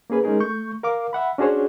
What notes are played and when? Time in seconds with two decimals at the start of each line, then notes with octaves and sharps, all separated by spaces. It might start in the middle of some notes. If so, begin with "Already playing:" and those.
0.10 A#3 C#4 G#4 B4
0.24 G#3 C#4 D#4 G#4 A#4
0.40 A3 C#6 G6
0.83 A#4 F5 D6
1.13 E5 F#5 B5
1.38 C#4 D4 F#4 G#4 C5 C#5